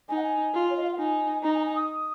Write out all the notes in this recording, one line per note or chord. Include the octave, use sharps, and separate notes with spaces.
D#4 G#5
F#5
G#5
F4
C#5
D#5
F5
F#5
D#4 G#5
D#4 A#5
G#5
A#5
G#5
D#6